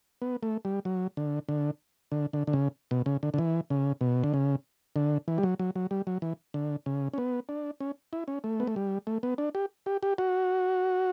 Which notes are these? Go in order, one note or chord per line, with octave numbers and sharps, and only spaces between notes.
B3
A3
G3
F#3
D3
D3
D3
D3
D3
C#3
B2
C#3
D3
D3
E3
C#3
B2
D3
C#3
D3
E3
G3
F#3
F#3
F#3
G3
F#3
E3
D3
C#3
C#4
B3
D4
C#4
E4
C#4
A3
B3
A3
G3
A3
B3
D4
G4
G4
G4
F#4